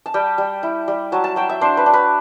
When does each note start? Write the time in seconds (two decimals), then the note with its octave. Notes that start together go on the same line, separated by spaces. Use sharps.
0.06 A5
0.14 G3 G5
0.38 G3
0.63 E4
0.88 G3
1.12 F#3 A5
1.24 A5
1.36 F#3 G5
1.49 E5
1.61 D4 C5
1.77 B4
1.86 D4
1.94 B4